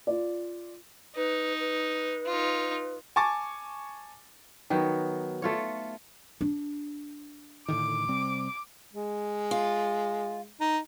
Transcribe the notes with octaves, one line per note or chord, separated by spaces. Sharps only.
F4 D5
D#4 B4
B4
D#4 F4
G#5 A5 C#6 D6 A6
D#3 F#3 B3 F#4
A3 F4 C#5
D4
A2 D3 D#3 D6
C3 G3 C4
G#3
F4
D#4